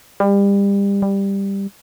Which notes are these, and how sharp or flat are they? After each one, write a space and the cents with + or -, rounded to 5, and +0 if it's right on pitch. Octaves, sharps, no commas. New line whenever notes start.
G3 +30
G3 +10